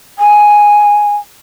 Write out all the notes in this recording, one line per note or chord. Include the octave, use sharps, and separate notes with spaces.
G#5